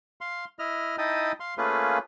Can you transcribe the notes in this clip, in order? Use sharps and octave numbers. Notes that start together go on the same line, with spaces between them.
F5 C6
E4 D#5 F6
D#4 E4 D#5 G5 A5 D#6
F5 C6
A3 A#3 C#4 F4 G#4 B4